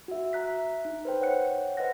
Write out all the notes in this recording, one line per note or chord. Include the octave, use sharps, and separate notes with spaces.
F#4 E5
E5 A#5 F#6 B6
D#4
B4 C5 G5
C#5 F#5 G5 F#6 C#7
B4 C5 D#5 F#5 F#6 A#6